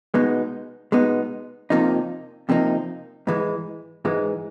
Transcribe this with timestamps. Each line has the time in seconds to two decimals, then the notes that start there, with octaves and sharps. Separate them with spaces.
0.14 B2 G#3 B3 D#4
0.92 B2 G#3 B3 D#4
1.70 F2 C3 F3 A#3 D#4
2.49 F2 C3 F3 A#3 D#4
3.27 G#2 E3 G#3
4.05 G#2 E3 G#3